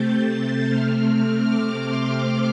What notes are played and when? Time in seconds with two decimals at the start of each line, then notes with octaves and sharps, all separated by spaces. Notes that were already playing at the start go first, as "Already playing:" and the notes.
Already playing: C3 A3 C4 G6 A6
0.28 G6
0.68 C3 A3 C4 F6
1.47 D6
1.87 C6